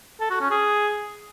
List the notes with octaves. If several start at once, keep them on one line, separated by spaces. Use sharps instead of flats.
A4
F#4
C#4
G#4